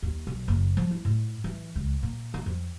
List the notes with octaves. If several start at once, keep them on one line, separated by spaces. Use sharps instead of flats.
D#2
B1
F#1
F3
E4
A2
E3
C#2
A#2
D#3
F2